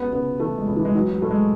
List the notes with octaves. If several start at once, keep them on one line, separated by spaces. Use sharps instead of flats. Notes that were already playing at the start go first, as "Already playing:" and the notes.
Already playing: C#2 B3
C#3 B3
E3 A3
G#3
C#2
E3
G#3
E3 F#3
F#3
A2 A3
G#3